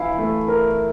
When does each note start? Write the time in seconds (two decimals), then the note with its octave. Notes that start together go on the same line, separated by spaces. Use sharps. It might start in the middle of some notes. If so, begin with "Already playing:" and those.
Already playing: E3 E4 F5
0.18 A3
0.48 A#4